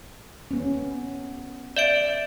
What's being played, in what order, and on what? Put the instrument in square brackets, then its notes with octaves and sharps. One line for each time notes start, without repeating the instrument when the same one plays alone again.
[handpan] B3 C#4
[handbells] D5 E5 D7